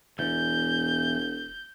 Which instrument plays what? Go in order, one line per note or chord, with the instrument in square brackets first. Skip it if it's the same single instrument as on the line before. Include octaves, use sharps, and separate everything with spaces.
[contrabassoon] E1 [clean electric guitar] E2 [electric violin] G6